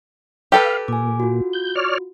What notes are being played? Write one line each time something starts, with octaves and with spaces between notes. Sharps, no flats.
G4 A4 B4 F5
A#2 G#5 D6
F4 F#4
G6
C#5 D5 F6